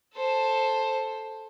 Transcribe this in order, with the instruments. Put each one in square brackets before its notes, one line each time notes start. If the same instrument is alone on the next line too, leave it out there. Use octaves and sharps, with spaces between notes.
[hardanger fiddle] A4 C5